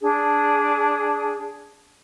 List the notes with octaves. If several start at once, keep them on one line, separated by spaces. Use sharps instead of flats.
D4 G#4